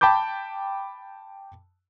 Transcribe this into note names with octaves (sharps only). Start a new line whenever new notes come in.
G5 A5 B5 D6 G6